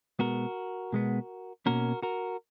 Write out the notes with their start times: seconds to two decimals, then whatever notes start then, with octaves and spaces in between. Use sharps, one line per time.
0.19 B2 G#3 B3 F#4 A#4
0.93 B2 G#3 B3
1.66 B2 A#3 C#4 F#4 A#4
2.03 F#4 A#4